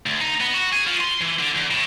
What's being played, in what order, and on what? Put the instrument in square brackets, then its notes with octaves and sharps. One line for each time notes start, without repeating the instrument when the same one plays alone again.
[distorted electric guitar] D2
D#4
B3
F#4
G#4
F3
C6
E3
D3
E2
A2